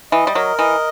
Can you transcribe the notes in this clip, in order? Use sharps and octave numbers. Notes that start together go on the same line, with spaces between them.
E3 D#5
G3
F#3 A#4
E3 D#5